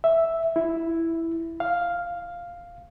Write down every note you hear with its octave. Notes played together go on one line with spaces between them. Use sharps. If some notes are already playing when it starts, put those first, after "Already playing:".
E5
E4
F5